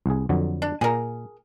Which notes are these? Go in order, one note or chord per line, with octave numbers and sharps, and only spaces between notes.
C2 G#4
F2 D3 F#3
D4
A#2 G#4 A#4